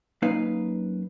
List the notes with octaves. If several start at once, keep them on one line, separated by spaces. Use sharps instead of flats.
F#2 A#3 D#4 B4 F5